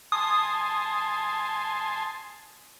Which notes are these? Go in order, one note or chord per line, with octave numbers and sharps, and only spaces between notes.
G#5 A5 C6 D#6